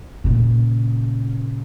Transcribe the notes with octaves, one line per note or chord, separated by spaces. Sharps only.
A#2 C#3